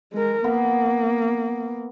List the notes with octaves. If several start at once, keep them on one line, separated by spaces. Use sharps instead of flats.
G#3 A#4
A#3 B3